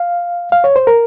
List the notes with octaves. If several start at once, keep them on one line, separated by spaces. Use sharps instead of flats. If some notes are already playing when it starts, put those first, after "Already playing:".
Already playing: F5
F5
C#5
C5
A#4